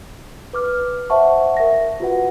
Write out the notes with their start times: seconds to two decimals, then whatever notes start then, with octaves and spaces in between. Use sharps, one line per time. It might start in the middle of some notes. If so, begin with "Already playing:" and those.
0.53 B4 D6 F6
1.10 C5 E5 F#5 A5 C#6
1.57 A#4 E5 A#6
2.00 F4 F#4 B4 F#5